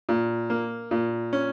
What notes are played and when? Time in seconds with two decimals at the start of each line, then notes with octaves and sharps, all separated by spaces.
0.09 A#2
0.50 A#3
0.91 A#2
1.33 C#4